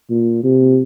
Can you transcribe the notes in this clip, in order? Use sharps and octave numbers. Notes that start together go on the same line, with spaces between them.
A#2
C3